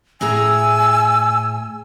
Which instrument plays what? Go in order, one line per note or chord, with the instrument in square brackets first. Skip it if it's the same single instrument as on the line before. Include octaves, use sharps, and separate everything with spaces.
[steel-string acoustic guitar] A2 G#4 A#5 [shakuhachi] G#5 [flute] E6